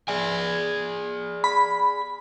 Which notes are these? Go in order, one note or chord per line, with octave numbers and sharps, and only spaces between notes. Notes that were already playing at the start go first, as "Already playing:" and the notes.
G#4 D5 G#5
B5